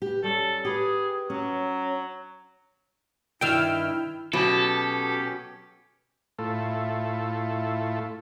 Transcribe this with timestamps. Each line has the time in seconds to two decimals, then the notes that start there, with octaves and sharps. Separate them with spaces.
0.02 G4 B4
0.24 G3 C#4 A4
0.65 G4 G#4 B4
1.30 F#3 C#4
3.41 G2 D#3 E4 G5 E6 F6
4.33 B2 F#3 C#4 G4 A4
6.39 A2 A3 E4 F4 A4